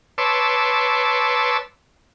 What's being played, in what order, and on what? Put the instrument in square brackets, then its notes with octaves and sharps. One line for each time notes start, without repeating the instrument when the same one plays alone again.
[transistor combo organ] B4 C#5 A5 C6 D6 E6